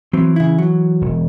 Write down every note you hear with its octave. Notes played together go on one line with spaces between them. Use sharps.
E3 F#3 C4
C#3 E4
F#3
E1